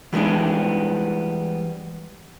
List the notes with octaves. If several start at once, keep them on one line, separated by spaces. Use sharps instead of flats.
E3 G3 G#3 B3 D4